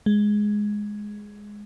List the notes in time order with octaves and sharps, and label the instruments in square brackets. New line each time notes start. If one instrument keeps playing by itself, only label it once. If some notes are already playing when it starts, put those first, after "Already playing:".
[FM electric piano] G#3